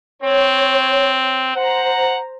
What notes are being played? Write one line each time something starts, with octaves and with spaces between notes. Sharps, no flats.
C4 C#5
C5 F#5 A#5